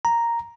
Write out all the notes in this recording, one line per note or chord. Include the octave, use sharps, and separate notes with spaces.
A#5